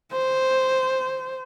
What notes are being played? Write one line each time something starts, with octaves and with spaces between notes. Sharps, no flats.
C5